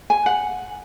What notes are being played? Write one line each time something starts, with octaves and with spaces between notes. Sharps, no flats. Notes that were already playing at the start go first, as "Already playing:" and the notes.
G#5
F#5